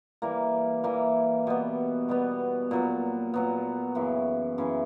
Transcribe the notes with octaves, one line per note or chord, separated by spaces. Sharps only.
E3 G3 A#3
E3 G3 A#3
B2 G3 B3
B2 G3 B3
A#2 F#3 B3
A#2 F#3 B3
F#2 C#3 E3
F#2 C#3 E3